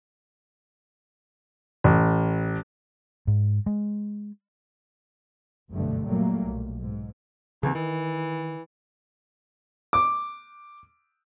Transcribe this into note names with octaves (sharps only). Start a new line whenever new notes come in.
A1
G#2
G#3
F#1 D2 G2 B2 D3 A3
A#2 F#3 G3 A3 A#3
B1
G#2
D#2 C#3 E3 C4
D#3 E3
D6